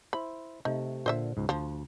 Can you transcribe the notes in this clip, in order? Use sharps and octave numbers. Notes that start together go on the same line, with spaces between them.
E4 C5 B5
C3 A3 D#4
A#2 D3 C5 D#5 E5
C#2 G#2
D2 F3